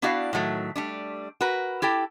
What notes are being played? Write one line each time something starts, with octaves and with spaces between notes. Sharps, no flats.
B3 D4 E4 F#4 D5 F5
A2 D#3 F#3 A3
G3 A3 D4
F#4 A#4 B4
E4 G4 A4 G5